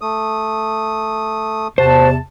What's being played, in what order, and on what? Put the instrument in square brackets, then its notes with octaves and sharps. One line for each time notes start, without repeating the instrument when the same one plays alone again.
[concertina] A3 D#6
[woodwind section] E2 C3 A5 [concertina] F#4 [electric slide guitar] C5